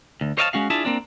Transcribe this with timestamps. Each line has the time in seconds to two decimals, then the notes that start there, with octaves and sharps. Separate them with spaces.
0.21 D2
0.38 C5 C#5 D#5 F5 G5 A5
0.53 G#3 C#4 F#4 F5
0.70 D4 E4 F4 G#4 E5 A5
0.85 A#3 C4 D4